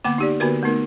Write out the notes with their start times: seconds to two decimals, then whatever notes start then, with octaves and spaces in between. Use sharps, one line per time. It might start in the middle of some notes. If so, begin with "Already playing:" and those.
0.04 D3 A#3 B3 F#5 G5 D6
0.18 D#4 G4 D5
0.40 D3 A#3 B3 F#4 A#4 B4
0.63 A3 B3 D#4 A#4